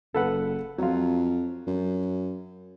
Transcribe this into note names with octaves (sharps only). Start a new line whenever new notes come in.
F#1 A4 B4 F#5
F2 F#3 F4
F#2